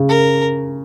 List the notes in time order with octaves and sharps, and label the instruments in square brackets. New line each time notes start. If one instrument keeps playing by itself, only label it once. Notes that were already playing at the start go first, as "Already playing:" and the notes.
Already playing: [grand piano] C#3
[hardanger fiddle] A#4